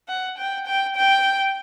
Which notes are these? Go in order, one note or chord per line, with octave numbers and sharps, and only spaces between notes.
F#5
G5
G5
G5